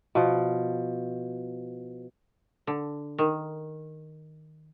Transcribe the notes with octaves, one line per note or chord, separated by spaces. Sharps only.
B2 F3
D3
D#3